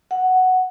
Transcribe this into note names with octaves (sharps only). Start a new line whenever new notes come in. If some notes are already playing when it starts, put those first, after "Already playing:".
F#5